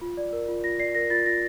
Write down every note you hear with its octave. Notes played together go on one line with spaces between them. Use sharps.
F4
D5
A#4
F4
F4 A#6
D5 C7
A#4 A#6
F4 A6
F4 A#6